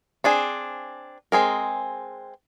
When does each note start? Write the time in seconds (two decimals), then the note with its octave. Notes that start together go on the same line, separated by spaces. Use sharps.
0.24 C4 D4 G#4
1.32 G#3 C4 G#4 A#4